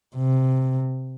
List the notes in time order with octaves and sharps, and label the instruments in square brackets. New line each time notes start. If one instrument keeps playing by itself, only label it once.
[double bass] C3